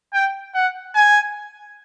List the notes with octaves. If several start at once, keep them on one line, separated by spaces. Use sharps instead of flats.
G5
F#5
G#5